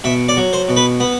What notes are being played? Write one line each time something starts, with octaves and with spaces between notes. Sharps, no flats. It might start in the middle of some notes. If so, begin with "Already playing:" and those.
B2 E5
D5
F#3
C5
B2
B4
B3